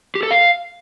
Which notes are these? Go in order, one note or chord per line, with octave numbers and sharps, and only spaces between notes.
G4
A4
F5